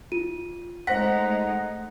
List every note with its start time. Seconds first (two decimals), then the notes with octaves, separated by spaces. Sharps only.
0.12 E4 F4 D#7
0.87 G#3 A3 D#4 C5 F#5 A#6 B6